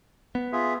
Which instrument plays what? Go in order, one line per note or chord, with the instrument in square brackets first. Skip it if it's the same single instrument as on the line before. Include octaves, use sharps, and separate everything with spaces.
[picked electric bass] B3
[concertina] F4 G#4 E5